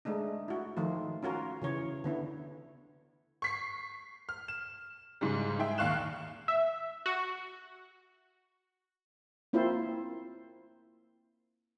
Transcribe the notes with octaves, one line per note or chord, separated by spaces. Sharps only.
G#3 A3 D4 D#4
E4 F#4
D#3 F3 A3 F4
C#4 F4 F#4 A#4
C#3 E3 C#5
D3 B3 E4
C#6 B6 C7
F6
E7
G#2 C#3 G3
G#2 G#4 E5 G5
A#1 D#2 F5 C#6 F#6 E7
E5
F#4
A#3 C4 E4 F4 C5